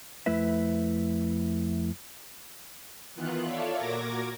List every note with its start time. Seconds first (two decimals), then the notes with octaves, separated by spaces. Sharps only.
0.26 F2 A3 E4 B4 E5
3.15 D#3 E3 B3 F4 F#6
3.45 F4 A4 C#5 D5 E5 F5
3.76 A#2 F#4 A#4 D6 G#6 A#6